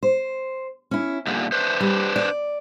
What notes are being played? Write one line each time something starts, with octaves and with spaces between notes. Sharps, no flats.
C5
C#4 E4
A#2 D3 G3 E5
D4 B4 C5
G3
D5